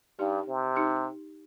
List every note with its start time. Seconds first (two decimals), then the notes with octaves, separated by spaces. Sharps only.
0.19 G2 D#4 G4
0.48 C3
0.76 D#4 G4